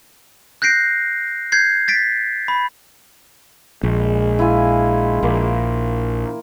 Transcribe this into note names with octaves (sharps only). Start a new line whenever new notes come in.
F#6 G6 A#6 C7 D7
G6 G#6 C7
A6 B6 D7
B5
A#1 G#3
E4 F4 G#5
A#1 A#3